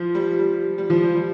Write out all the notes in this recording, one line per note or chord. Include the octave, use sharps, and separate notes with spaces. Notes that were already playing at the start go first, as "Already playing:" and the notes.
Already playing: F3
G3
G3
G3
F3
G3
G3